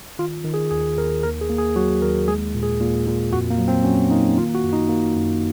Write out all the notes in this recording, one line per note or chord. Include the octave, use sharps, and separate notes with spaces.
D#3 F4
D#3
G#4
D#2 G#4
D#2 A#4
D#2 A#4
G#4
A#3
G#4
F#3 F#4
D#2 A#4
G#3 G#4
A#2
G#4
A#2
A#2
F2 F#4
A#3
F#3
C4
F#3 C#4
A#3 D#4
D#3 F4
F#4
F#2
D#4
A#3
F#2